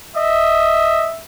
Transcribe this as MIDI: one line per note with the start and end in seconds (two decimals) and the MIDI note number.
0.16 1.09 75
0.16 1.22 76